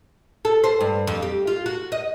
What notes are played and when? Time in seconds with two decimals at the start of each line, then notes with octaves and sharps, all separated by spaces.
0.45 A4
0.64 C5
0.81 G2
1.07 F2
1.22 G4
1.47 F4
1.66 F#4
1.92 D#5